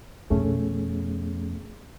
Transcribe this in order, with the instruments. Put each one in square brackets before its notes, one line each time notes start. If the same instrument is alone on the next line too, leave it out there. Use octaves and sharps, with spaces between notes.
[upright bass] F2 B2 [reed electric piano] A3 C#4 G#4